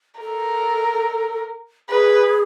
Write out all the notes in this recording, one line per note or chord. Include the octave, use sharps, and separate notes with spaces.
A4 A#4
G#4 B4